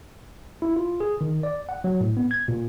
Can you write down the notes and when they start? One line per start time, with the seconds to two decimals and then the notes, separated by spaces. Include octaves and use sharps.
0.62 E4
0.76 F4
1.00 G#4
1.21 D#3
1.43 D5
1.69 F#5
1.84 F#3
2.00 A2
2.17 B3
2.31 G#6
2.48 A#2